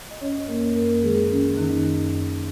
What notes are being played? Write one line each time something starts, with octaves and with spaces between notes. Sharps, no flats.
D#5
F#2 C#4 C#5
F#2 A#3 A#4
F#2 A#3 A#4
D#3 G#3 G#4
D#3 C#4
F#2 D#3 D#4
F#2
F#2